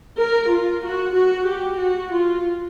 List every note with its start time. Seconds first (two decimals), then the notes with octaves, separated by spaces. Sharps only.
0.18 A#4
0.50 F4
0.83 F#4
1.14 F#4
1.47 G4
1.79 F#4
2.12 F4